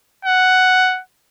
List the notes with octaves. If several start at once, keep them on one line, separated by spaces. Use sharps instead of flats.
F#5